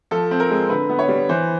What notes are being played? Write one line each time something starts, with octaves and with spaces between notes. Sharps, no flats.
F3 A4
C4
A#4
G#3
D3 B4
B3
C#5
G3
E3 C5